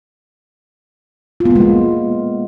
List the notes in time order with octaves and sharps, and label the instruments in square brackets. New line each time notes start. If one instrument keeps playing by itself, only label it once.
[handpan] F4
B3
A#3
G#3
F4